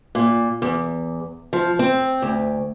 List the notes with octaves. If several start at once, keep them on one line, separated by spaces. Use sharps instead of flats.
A#2
E2
F3
C4
D2